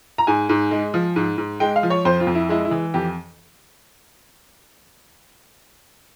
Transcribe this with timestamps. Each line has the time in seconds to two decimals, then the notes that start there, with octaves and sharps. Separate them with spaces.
0.18 A#5
0.27 G#2 G#5
0.49 G#2
0.71 G#3
0.94 F3
1.16 G#2
1.38 G#2
1.60 G#3 G5
1.76 F5
1.83 F3
1.90 C#5
2.05 F2 C5
2.20 F4
2.27 F2
2.35 E4
2.49 G#3 E4
2.65 E4
2.71 E3
2.94 F2 G4